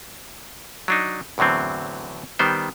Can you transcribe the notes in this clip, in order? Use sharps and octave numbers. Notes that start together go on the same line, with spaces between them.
F#3 D4 D#4
E2 A2 D3 F#3 C4
D#3 G3 B3 C5